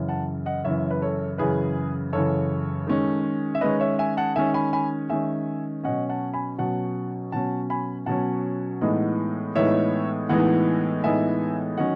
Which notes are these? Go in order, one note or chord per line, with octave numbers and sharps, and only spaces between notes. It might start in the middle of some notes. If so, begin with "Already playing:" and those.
Already playing: F#2 C#3 E3
F#5 A5
D#5 F#5
F#2 C#3 E3 C#5 E5
B4
A4 C#5
F#2 C#3 E3 G#4 B4
F#2 C#3 E3 A4 C#5
D#3 G#3 C#4
E5
D#3 G#3 C#4 B4 D#5
C#5 E5
E5 G#5
F#5 A5
D#3 G#3 C#4 E5 G#5
G#5 B5
G#5 B5
D#3 G#3 C#4 E5 G#5
B2 F#3 C#4 D#5 F#5
F#5 A5
G#5 B5
B2 F#3 C#4 F#5 A5
B2 F#3 C#4 F#5 A5
G#5 B5
B2 F#3 C#4 F#5 A5
A2 E3 G#3 B3 D#4
A2 E3 G#3 B3 D#4 C#5 E5
A2 E3 G#3 B3 D#4 D#5 F#5
A2 E3 G#3 B3 D#4 E5 G#5
D#3 F#3 C#4 D#5 F#5